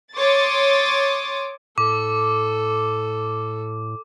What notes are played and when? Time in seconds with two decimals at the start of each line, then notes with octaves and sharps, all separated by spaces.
0.16 C#5 C6 D6 D#6 A6
1.78 A2 A4 D6